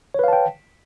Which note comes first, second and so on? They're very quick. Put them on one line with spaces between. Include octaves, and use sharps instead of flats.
C#5 B4 F5 A5 G5